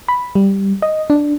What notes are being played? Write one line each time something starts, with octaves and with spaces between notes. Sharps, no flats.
B5
G3
D#5
D4